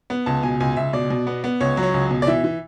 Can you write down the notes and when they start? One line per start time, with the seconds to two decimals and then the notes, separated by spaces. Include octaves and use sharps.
0.10 B3
0.26 C#2 A5
0.43 B2 G#5
0.60 C#2 G#5
0.76 C#2 E5
0.93 B2 D5
1.10 B2
1.27 B3
1.44 B3
1.60 C#2 C#5
1.77 F#3
1.83 C#5
1.94 C#2
2.11 B2
2.22 D5
2.27 E3 E5
2.44 E3